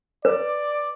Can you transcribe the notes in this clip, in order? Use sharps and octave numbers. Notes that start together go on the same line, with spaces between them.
B4 D5